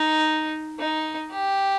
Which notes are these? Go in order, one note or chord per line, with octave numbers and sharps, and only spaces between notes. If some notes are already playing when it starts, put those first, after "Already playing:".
Already playing: D#4
D#4
G4